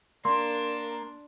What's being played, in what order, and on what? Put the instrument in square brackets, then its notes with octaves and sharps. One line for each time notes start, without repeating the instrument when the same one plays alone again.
[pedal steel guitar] A#3 [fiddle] D4 [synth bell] C6